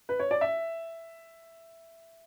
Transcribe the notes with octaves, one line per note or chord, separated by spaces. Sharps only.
B4
C#5
D5
E5